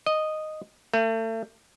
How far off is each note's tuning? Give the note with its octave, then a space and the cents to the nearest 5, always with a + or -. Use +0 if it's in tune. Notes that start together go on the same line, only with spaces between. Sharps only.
D#5 -5
A3 +35